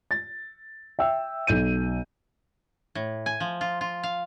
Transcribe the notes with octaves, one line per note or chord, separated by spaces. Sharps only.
A6
E5 G5 E6
B1 G6 D#7
A2
G#5
F3
F4
F4
F5